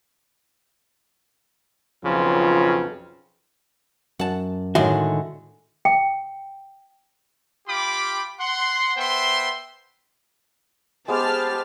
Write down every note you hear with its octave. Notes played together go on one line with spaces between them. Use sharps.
B1 F2 C#3 F3 F4
F#2 F#5 A5
A2 D3 D#3 G#3 F#4 E5 C6
G5
F4 G4 G5 B5 D6
F#5 C6
B3 C5 E5 G5 C6
G#3 B3 G4 G#4 C5 A5 D6 F6